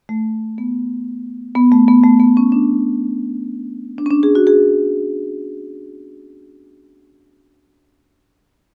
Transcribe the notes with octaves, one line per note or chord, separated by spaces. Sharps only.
A3
B3
B3
A3
B3
A3
B3
C#4
D4
D4
C#4
D4
G#4
F#4
G#4